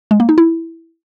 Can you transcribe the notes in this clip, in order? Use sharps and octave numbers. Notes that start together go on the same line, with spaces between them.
G#3
A#3
D#4
E4